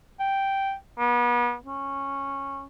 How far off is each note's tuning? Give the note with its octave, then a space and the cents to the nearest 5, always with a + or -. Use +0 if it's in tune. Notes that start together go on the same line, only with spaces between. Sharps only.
G5 -5
B3 -35
C#4 -10